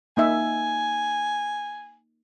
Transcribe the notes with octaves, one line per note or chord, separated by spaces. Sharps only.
A#3 D#4 E5 G#5